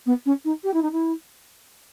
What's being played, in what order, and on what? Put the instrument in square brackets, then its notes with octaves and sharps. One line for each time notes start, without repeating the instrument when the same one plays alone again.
[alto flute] B3
C#4
D#4
G4
E4
D#4
E4